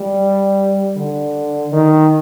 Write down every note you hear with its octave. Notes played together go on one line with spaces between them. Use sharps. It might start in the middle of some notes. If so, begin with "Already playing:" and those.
Already playing: G3
D3
D#3